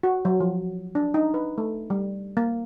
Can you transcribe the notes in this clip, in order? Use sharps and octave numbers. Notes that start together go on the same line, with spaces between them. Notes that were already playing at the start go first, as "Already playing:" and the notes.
F#4
F#3
F3
D4
D#4
B4
A3
G3
A#3